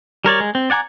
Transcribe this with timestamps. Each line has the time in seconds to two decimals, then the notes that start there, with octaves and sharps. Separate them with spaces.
0.25 G3 A#4 C#5 D5
0.40 G#3
0.55 C4
0.70 D5 F#5 G#5 A#5 D6